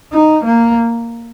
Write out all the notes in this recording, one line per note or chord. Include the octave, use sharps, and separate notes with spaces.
D#4
A#3